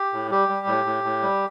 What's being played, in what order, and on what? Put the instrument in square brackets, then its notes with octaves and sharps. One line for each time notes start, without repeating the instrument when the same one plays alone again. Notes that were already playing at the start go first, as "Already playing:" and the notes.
Already playing: [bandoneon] G4
A2
G3 G4
G3
A2
A2
A2
G3